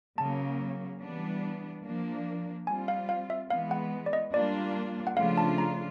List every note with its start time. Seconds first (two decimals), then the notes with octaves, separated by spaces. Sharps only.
0.18 C#3 F#3 A#3 A5
1.01 E3 G3 B3 D4
1.84 F3 A#3 D4
2.67 G3 C4 F4 G#5
2.88 F5
3.09 F5
3.30 E5
3.50 E3 G#3 B3 F5
3.71 F#5
4.06 D5
4.13 D#5
4.34 G3 A#3 D4 F4 D5
5.07 F#5
5.16 C#3 F3 A3 D4 F4 F5
5.37 A5
5.58 A#5